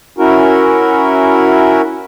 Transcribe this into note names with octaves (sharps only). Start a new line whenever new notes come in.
C#4 E4 F#4 A#4